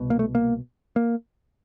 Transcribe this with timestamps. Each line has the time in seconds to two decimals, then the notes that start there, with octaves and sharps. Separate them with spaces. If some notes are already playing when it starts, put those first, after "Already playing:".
Already playing: C2 B2
0.10 A#3
0.19 A3
0.35 A#3
0.96 A#3